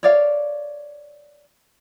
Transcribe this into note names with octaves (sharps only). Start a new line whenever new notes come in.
C#5 D5 F5